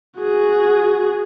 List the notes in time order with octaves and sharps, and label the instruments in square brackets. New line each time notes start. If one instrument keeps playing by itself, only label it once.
[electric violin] F#4 G#4